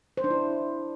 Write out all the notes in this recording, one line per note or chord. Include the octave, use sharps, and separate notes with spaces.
C5
D4
E4